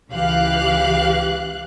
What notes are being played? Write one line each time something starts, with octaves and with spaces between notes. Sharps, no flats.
C#2 E3 G4 F5 F#6